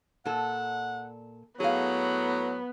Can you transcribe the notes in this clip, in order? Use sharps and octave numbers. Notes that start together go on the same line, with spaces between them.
A#2 A4 F#5
A2 F#3 B3 G#4 F5 A#5